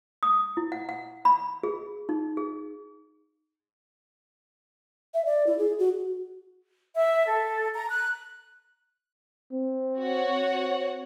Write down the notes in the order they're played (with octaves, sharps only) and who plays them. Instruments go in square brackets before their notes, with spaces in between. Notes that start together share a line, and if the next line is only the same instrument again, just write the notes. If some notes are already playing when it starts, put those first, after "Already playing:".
[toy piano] D#6
E4
F#5
F#5
B5
G#4
D#4
G#4
[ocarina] E5
D5
E4
G#4
F#4
[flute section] E5
A4
A#5
F#6
[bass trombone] C4
[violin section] F#4 C#5 F#5
[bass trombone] C4